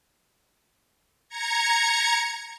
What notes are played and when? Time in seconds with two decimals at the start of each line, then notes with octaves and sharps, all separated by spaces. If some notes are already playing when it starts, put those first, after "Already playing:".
1.29 A#5 G#6 C#7